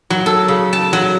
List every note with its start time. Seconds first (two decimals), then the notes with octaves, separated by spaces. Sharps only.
0.10 F#3
0.26 A4
0.48 C#3
0.73 A5
0.93 F#3